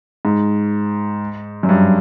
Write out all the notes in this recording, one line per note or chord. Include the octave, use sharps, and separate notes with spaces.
G#2
F#2
G2